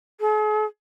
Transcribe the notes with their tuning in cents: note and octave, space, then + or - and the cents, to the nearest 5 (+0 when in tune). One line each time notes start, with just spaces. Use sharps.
G#4 +45